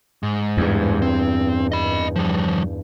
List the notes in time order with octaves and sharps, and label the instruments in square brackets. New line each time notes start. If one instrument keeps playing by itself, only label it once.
[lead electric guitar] G#2
[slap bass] E2 G2
[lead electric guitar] C4
D#5 B5
F3 G3